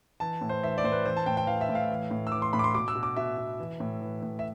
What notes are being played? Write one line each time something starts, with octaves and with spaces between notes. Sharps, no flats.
E3 A5
A2
C5
E3 E5
D5
A2 C5
B4
E3 C5
A5
A2 G5
G5
E3 F5
E5
A2
F5
E3
A2
E6
E3 D6
C6
A2 B5
D6
C6
B2 D6
E6
B2
D6
B2 E5
B2
E3
A2
E3
A2
E5